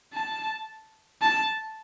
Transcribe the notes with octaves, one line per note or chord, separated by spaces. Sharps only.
A5
A5